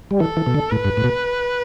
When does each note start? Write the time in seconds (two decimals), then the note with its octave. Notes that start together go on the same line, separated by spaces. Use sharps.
0.11 G3
0.20 E3 A4
0.37 E3
0.46 B2
0.55 D3
0.71 A2 B4
0.85 G2
0.97 A2
1.04 B2